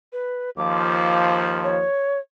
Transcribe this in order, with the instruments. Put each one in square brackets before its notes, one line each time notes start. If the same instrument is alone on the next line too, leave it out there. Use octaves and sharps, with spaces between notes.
[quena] B4
[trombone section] D#2 F3 [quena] D6
[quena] C#5